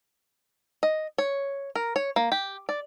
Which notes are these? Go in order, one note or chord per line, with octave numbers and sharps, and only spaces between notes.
D#5
C#5
A#4
C#5
A#3
G4
D5